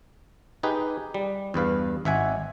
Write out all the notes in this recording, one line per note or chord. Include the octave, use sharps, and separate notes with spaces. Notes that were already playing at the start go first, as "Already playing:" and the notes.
D#4 G4 G#4 B4
G3
E2 G2 B4 F5
G#1 E5 F#5 G#5